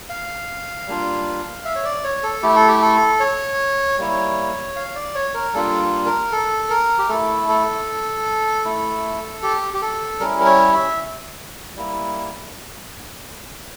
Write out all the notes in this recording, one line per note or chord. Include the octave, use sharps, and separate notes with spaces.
F5
G3 A#3 D4 F4
E5
C#5
D5
C#5
A4
A3 E4 G4
A4
G4
A4
C#5
G3 A#3 E4
F5
D5
C#5
A#4
G3 A#3 D4 F4 A4
A#4
A4
A#4
G4
A3 E4 A4
A4
A3 E4
G4
G4
A4
G3 C#4 E4 A#4
A#4
C#5
E5
G3 A#3 E4